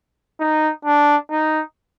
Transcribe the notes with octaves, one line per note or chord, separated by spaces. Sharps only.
D#4
D4
D#4